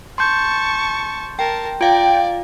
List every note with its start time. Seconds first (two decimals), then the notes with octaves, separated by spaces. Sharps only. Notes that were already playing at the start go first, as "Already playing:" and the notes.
0.18 A5 C6 C#6 G6
1.39 A#4 G5 A5
1.81 F4 D5 F5 G5